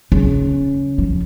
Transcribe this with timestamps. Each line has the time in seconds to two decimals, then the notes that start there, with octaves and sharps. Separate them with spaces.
0.12 C#3
0.98 F3